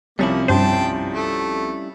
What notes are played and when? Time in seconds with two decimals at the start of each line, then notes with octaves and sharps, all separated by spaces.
0.19 C2 C3 F3 G3 A#3 C#4 E4
0.48 G2 C5 G5 A5 C6
1.14 A3